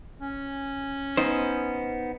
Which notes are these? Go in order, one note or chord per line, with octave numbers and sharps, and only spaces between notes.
C#4
B3 D#4 C5